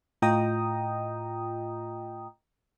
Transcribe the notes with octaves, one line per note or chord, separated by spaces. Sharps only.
A2 F4 D#5 G5 A#5 D#6